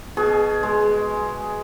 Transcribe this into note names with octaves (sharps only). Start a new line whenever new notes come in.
B2 G#4
G#3